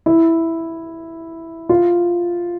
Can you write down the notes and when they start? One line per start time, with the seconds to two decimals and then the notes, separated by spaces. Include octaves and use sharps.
0.06 E4
1.69 F4